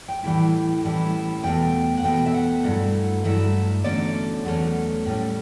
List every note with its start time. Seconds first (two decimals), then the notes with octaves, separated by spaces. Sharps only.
0.08 G5
0.23 A2 E3 G3 C#4 E4
0.83 A2 E3 G3 C#4 E4
1.43 E2 B2 A3 G5
1.97 F#5
2.03 E2 B2 A3 G5
2.26 E5
2.34 F#5
2.64 G2 F#3 A3 E4
3.24 G2 F#3 A3 E4 E5
3.84 E2 D3 F#3 A3 C#4 D5
4.45 E2 D3 F#3 A3 C#4
5.05 A2 G3 C#4